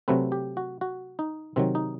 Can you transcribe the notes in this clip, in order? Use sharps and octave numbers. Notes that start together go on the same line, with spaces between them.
C3 F#3 A3 C4 B4
G4
F#4
F#4
D#4
C3 D#3 F#3 C4
D#4